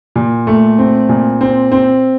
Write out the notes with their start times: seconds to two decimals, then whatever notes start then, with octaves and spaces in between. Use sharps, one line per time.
0.16 A#2
0.47 A3
0.79 C4
1.09 A#2
1.41 C4
1.72 C4